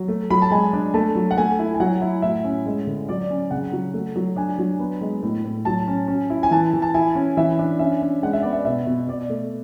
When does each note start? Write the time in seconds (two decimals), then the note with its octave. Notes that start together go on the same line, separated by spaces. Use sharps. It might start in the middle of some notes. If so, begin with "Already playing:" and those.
Already playing: F#3
0.08 A3
0.30 F#3 B5
0.42 A5
0.51 G#3 G#5
0.73 D4
0.94 A3 A5
1.15 F#3
1.31 F#5
1.37 A3 G#5
1.59 E4
1.74 G#5
1.80 F#3 F#5
2.02 E4
2.22 A2 E5
2.44 C#4
2.66 G#3
2.87 D3
3.09 F#3 D5
3.30 C#4
3.51 C#3 F#5
3.72 F#3
3.94 A3
4.16 F#3
4.36 D4 G#5
4.59 F#3
4.79 B3
5.01 G#3
5.22 A2
5.44 A2
5.65 F#3 A5
5.88 C#4
6.08 C#4
6.30 E4
6.43 G#5
6.51 E3 A5
6.73 E3
6.82 A5
6.94 E4 G#5
7.15 C#4
7.37 E3 E5
7.59 D4
7.79 C#4 E5
8.02 C#4
8.23 G#3 F#5
8.33 E5
8.42 B3 D5
8.53 E5
8.65 B2 E5
8.86 B2
9.08 B2 D5
9.29 A3